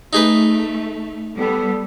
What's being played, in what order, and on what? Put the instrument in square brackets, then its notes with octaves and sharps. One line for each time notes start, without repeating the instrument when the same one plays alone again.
[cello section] A3 [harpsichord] D#4 G#4 B4
[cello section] G3 B3 [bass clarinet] A4